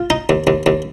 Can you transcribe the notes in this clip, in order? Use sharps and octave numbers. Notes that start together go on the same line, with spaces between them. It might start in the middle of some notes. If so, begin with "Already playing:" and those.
Already playing: F4
D#4
D#2
D#2
D#2